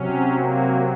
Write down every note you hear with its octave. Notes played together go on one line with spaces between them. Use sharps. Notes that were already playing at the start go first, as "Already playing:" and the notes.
Already playing: C3 F#3 C#4
A#3